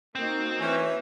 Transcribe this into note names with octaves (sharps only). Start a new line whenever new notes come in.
A#3 C4 D#4 F#4
E3 C#4